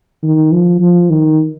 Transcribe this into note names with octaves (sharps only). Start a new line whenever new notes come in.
D#3
F3
F3
D#3